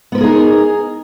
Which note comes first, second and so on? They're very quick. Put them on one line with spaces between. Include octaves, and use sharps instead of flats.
B3 B4 A#4 G#4 D#4